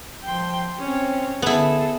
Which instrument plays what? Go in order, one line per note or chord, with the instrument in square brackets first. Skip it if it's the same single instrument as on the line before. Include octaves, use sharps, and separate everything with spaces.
[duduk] F3 [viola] G5 C6
[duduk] C4 [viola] C#4 C#5
[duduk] D3 [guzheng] B3 E4 [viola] G#4 A4